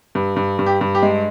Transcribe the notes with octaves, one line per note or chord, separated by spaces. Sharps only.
G2
G2
G2
G4
G2
G4
G#3